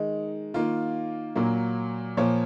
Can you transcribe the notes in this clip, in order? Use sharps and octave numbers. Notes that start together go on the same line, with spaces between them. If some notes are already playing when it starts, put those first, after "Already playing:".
Already playing: D#3 G#3 D#4
D#3 A#3 F4
A#2 F#3 A#3
A#2 F3 A#3 C#5